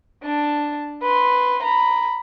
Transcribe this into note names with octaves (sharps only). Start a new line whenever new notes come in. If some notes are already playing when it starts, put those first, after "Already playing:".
D4 A5
B4 C6
A#5 B5